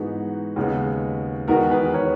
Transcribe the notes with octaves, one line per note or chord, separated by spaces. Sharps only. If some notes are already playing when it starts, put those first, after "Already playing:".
Already playing: G#2 E3 G#3 B3 D#4 F#4
D#2 C#3 G#3 B3
E2 D#3 G#3 B3 F#4 A#4
G#4 B4
A#4 C#5